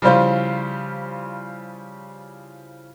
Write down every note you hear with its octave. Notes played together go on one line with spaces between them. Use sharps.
C#3 F3 G3 E4 F4 C5